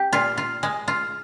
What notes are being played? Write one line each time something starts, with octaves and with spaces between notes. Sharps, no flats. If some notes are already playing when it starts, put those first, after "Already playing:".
Already playing: G4
A#2 F4
F4
G#3
F4